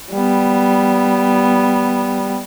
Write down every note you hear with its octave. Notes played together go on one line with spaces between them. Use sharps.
G3 B3